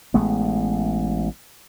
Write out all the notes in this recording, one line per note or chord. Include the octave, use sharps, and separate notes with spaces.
A1 G#3 A3 B3